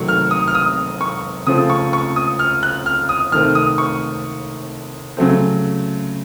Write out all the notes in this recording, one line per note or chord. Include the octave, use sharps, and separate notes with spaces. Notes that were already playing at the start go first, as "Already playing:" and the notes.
Already playing: C3 D#3 F#3 A3 C4 C#6
F6
D#6
F6
D#6
C#6
C#3 F3 A3 C4 D#6
C#6
C#6
D#6
F6
F#6
F6
D#6
C3 D#3 A3 C4 F6
D#6
C#6
C#3 F#3 A3 C4